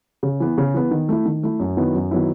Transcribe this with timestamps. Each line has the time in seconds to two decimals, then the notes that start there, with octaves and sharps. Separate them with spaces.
0.23 C#3
0.40 E3 B3
0.58 C#3
0.74 E3 B3
0.91 D#3
1.09 A3 E4
1.25 D#3
1.43 A3 E4
1.60 F#2
1.77 D#3 F#3 B3 E4
1.95 F#2
2.11 D#3 F#3 B3 E4